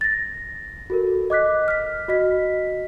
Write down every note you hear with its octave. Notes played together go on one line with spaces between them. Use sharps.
A6 A#6
F#4 A4 A#4
D#5 D6 F#6 B6
F6 B6
F#4 D#5 B6